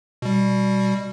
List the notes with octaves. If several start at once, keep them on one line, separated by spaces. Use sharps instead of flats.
B2 G3